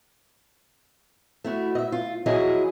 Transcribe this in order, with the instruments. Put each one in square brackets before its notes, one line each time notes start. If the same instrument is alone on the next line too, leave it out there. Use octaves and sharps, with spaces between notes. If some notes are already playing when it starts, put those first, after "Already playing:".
[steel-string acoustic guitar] A3 E4 F#4
D#5 E5
F4
F3 F#3 E4 G#4 D#5